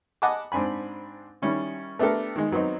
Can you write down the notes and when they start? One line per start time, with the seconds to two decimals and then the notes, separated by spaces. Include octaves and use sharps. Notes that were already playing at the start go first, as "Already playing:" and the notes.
0.22 D#5 F#5 G#5 A5 B5 D6
0.52 G#2 C4 D4 G#5 B5
1.42 D#3 G3 C#4 E4
1.99 A3 B3 D4 G4 A4 A#4
2.36 D#3 G#3
2.51 D#3 F#3 B3 C4 D#4